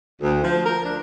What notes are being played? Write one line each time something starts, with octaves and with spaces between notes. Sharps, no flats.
D2
F3
A#4
D4